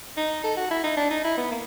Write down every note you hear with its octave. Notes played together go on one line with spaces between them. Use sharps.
D#4
A4
F#4
E4
D#4
D4
D#4
E4
B3
A#3